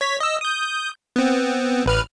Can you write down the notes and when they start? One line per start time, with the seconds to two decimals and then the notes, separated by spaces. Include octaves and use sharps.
0.01 C#5 B6
0.20 D#5 E6
0.41 D#6 G6
1.16 B3 C4
1.86 A1 B4 F6